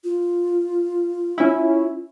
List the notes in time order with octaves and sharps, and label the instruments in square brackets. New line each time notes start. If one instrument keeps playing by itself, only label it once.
[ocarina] F4
[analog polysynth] C#4 E4